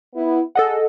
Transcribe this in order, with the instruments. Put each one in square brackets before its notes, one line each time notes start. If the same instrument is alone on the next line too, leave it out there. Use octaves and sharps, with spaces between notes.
[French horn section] B3 E4
[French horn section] G#4 [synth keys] A4 D#5 F#5